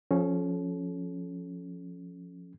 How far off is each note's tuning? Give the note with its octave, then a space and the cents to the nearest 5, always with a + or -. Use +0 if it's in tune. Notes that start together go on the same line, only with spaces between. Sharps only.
F3 +10 C#4 +0 A4 -35